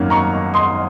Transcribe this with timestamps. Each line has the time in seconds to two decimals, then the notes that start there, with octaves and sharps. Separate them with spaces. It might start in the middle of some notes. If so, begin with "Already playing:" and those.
Already playing: G#1 F#2 D#3 A#3 C#4
0.10 A#5 C#6
0.54 C6 D#6